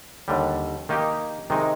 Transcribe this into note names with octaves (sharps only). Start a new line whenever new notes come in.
D#2 D3 G3
D#3 A#3 D#4 G4
C3 D#3 G#3 D#4